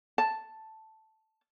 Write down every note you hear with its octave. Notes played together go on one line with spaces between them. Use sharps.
A5